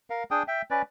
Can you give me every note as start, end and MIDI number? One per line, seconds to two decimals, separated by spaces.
0.10 0.23 70
0.10 0.23 77
0.31 0.43 62
0.31 0.43 68
0.31 0.43 79
0.31 0.43 87
0.48 0.62 76
0.48 0.62 79
0.71 0.82 61
0.71 0.82 71
0.71 0.82 74